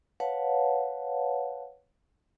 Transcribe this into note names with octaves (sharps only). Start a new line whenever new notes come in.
B4 C#5 F5 F#5 A5